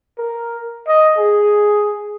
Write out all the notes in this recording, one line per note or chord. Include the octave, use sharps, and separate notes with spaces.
A#4
D#5
G#4